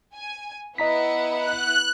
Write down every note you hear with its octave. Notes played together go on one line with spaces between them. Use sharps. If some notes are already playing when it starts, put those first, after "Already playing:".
G#5
B3 E4 D#5 F#5 A#5 B6
F#6